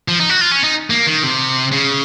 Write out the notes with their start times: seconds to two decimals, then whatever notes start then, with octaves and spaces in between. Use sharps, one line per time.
0.08 F3
0.20 D#4
0.29 F#4
0.41 F4
0.51 C#4
0.63 D#4
0.90 A#3
1.07 D#3
1.23 C3
1.72 C#3